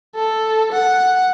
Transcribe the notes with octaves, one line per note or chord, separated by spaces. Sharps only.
A4
F#5